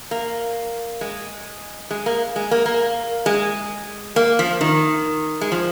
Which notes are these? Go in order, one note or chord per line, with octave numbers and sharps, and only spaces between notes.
A#3
G#3
G#3
A#3
G#3
A#3
A#3
G#3
A#3
F3
D#3
G#3
F3